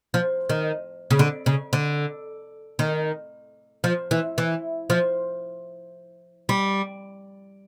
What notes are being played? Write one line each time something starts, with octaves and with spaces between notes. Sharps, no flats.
F3
D#3
C#3
D3
C#3
D3
D#3
F3
E3
E3
F3
G3